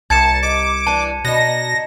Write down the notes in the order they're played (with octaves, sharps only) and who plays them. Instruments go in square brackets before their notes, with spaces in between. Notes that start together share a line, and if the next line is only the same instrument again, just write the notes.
[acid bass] C2 [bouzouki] A#3 [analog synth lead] A5 [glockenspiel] G#6 C#7 E7
[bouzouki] D#4 [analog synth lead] D6
[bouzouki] E3 D4 [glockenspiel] A5
[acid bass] B2 [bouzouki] D4 D#4 [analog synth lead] A#6